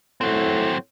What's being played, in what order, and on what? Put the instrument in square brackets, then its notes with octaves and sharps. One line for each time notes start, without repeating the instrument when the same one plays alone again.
[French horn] A2 [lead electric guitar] F#3 C4